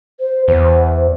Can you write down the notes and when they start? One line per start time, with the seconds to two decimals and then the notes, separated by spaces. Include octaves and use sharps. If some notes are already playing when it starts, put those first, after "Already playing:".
0.20 C5
0.48 E2 C5